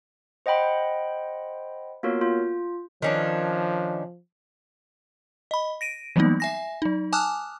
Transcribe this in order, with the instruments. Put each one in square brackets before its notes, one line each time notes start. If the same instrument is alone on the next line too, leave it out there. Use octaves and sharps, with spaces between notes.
[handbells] C5 D#5 F#5 G5 B5 C6
A#3 B3 F4 F#4 A#4 C#5
F4
[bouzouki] D#3 C#4 D4 [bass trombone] F3
[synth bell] D#5 B5
A#6 D7 D#7
E3 F#3 G3 A#3 B3 D#4
E5 G#5 A#6
F#3 D#4
G#5 A5 D6 D#6 F6 F#6